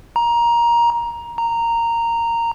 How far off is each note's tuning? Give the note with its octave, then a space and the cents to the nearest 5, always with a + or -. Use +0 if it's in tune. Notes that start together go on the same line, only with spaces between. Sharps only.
A#5 +15
A#5 -10